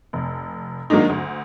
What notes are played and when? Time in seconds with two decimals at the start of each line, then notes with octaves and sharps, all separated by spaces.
0.13 F1
0.90 D#3 F#3 G#3 A#3 D4 D#4
1.10 D2